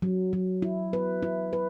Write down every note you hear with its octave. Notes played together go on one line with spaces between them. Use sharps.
F#3
F#3
E4
B4
E4
B4